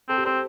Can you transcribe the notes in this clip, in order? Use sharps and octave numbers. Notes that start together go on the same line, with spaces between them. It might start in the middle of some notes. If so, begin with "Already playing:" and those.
C4 A4
G4
C4 C5